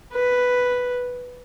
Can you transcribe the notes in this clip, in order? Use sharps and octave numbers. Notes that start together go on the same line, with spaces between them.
B4